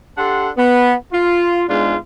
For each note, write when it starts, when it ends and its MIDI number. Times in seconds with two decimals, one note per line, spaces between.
0.18 0.50 62
0.18 0.50 67
0.18 0.50 69
0.18 0.50 78
0.18 0.50 84
0.57 0.94 59
1.12 1.64 65
1.69 1.95 44
1.69 1.95 56
1.69 1.95 59
1.69 1.95 62
1.69 1.95 65